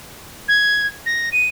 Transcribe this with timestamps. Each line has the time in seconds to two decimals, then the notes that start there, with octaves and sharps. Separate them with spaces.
0.48 G#6
1.06 A#6
1.32 D#7